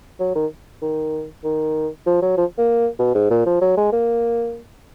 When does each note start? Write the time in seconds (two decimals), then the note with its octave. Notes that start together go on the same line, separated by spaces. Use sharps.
0.20 F#3
0.36 D#3
0.82 D#3
1.45 D#3
2.07 F3
2.22 F#3
2.38 F3
2.58 A#3
3.00 B2
3.15 G#2
3.31 A#2
3.46 F3
3.62 F#3
3.77 G#3
3.93 A#3